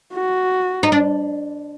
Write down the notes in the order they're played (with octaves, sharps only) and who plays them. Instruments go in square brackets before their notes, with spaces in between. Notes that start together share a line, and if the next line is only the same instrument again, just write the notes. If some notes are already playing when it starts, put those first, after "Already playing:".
[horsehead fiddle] F#4
[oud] D#4
D4